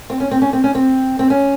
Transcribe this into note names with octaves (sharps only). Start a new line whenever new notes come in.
C4
C#4
C4
C#4
C4
C#4
C4
C4
C#4